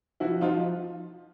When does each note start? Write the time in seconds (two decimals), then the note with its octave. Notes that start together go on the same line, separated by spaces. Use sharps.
0.20 F3 E4 F#4
0.41 F3 D#4 F4